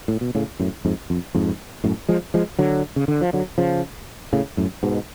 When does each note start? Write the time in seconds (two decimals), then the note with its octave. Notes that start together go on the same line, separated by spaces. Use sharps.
0.08 A2
0.21 B2
0.35 A2 C#3
0.60 F#2 A2
0.85 F2 G#2
1.10 F2
1.35 F2 G#2
1.84 F#2 A2
2.09 F3 G#3
2.34 F3 G#3
2.59 D3 F#3
2.96 C#3
3.08 D3
3.21 F3
3.33 D3 F#3
3.58 C#3 F3
4.33 A2 C#3
4.57 F#2 A2
4.83 G#2 B2